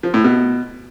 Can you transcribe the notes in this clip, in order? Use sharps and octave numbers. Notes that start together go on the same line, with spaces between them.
F3
A2
B2